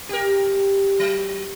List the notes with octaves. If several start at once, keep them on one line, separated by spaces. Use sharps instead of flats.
G4 A#4
F#3